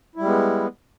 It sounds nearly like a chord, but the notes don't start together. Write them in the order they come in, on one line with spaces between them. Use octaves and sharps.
E4 G3 G#3 B3